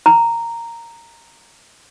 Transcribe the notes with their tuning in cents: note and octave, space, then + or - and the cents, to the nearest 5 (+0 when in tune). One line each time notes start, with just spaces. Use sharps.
A#5 -5